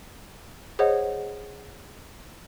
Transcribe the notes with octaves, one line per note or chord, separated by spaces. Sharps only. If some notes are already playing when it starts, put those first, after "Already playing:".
G#4 C5 C#5 D#5 F#5